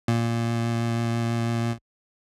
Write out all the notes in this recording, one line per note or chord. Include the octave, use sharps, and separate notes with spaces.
A#2